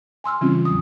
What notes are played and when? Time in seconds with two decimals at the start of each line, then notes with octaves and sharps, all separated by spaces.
0.24 G#5 C6 E6 F6
0.41 C#3 E3 G3 C4 C#4 F4
0.65 E2 A2 F#3 D#6